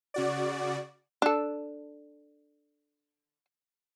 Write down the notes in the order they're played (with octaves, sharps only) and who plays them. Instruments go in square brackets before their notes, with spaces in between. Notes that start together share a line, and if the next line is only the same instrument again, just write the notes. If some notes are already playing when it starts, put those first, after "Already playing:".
[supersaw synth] C#3 F#4 D5
[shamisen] D4 A4